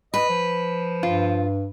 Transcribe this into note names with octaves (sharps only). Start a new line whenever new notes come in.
B4 D#5
F3
G2 F4